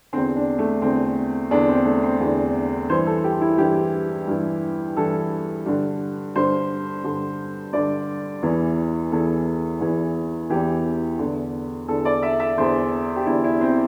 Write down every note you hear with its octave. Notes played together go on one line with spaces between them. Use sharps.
E2 D3 C4
D4
A3
E2 D3 C4
E2 D3 D4
C4
A3
C4
E2 D3
G2 E3 C5
A4
G4
E4
G2 E3 G4
G2 E3
G2 E3 A4
G2 D3
G2 D3 C5
G2 D3
G2 D3 D5
E2 E3
E2 E3 A4
E2 E3
E2 E3 G4
E2 D3
E2 D3 A4
D5
E5
E5
E2 D3 C5
G4
E2 D3 E4
E4
C4